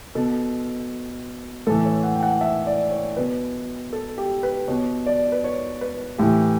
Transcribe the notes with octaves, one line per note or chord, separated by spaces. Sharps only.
B2 A4
A2 E3 A4
C#5
F#5
G5
F#5
E5
D5
C#5
B2 B4
A4
G4
B4
B2 C#5
D5
B4
C#5
B4
A2 E3 G4